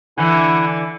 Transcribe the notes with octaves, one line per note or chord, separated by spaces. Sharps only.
D3 E3 E4 F#5 G#5